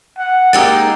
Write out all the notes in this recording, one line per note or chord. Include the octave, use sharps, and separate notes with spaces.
F#5
G#3 A#3 D#4 G4 E6 A6